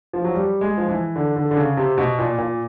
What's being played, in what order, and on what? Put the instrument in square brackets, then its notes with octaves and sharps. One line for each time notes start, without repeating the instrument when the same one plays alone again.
[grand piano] F3
F#3
G3
G#3
F3
E3
D3
D3
D3
C#3
C3
B2
A#2
A#2